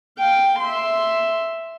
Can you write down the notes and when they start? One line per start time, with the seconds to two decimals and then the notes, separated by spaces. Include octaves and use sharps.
0.19 F5 G5
0.59 E5 C6